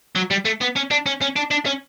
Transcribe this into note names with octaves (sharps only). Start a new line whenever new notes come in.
F#3
G3
A3
B3
C#4
D4
C#4
C#4
D4
D4
C#4